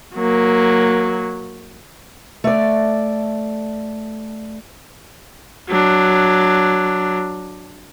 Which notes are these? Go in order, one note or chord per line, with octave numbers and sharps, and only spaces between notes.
F#3 A#3
A3 D5
F#3 D4